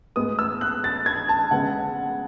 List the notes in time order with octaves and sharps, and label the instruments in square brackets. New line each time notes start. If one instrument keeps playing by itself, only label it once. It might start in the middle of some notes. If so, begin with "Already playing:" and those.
[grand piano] A2 G#3 B3 D#6
E6
F#6
A6
G#6
A5
C#3 G#3 B3 F#5